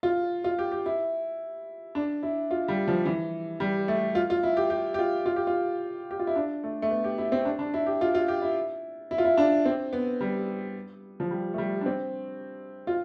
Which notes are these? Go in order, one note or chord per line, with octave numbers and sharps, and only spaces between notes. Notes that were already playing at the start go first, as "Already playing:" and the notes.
F4
F4
G4
G4
E4
D4
E4
F4
G3
F3
E3
G3
A3
F4
F4
E4
G4
G4
G4
F4
F4
G4
F4
G4
F4
E4
D4
A3
A3
B3
G4
E4
C4
D4
D4
E4
G4
F4
F4
G4
E4
E4
F4
E4
D4
C4
B3
G3
F3
G3
A3
G3
D4
C4
F4